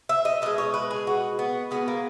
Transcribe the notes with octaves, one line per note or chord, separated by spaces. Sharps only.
E5
D#5
B2 G#3 D#5
C#5
B4
G#4
F#4
B3
B2 G#3 B3
A#3